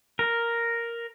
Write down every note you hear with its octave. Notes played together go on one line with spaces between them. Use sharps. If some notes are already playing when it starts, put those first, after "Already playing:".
A#4